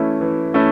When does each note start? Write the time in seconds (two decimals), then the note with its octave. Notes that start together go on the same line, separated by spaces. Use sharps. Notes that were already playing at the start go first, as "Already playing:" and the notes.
Already playing: E3 A3 C#4 E4
0.21 E3
0.54 A3 C#4 E4